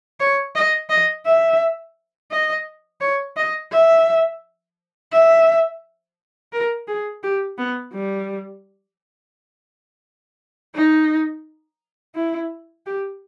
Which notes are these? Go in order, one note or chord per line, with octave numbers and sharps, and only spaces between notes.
C#5
D#5
D#5
E5
D#5
C#5
D#5
E5
E5
A#4
G#4
G4
B3
G3
D#4
E4
G4